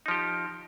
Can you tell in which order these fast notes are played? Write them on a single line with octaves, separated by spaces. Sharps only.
D#4 F3 G4